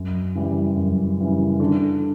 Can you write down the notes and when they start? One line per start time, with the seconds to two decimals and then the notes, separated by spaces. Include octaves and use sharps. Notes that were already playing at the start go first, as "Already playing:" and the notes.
Already playing: F#2
0.35 C#3 E3 G3
0.77 F#2
1.18 C#3 E3 G3
1.60 D3